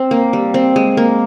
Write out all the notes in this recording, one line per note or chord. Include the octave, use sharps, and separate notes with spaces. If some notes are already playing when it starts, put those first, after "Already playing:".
Already playing: C4
A#3
G3
C4
G#3
A#3